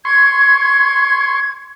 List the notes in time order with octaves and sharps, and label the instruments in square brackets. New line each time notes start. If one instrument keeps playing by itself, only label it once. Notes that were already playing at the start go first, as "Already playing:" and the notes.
[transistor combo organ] C6 C#6 [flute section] G#6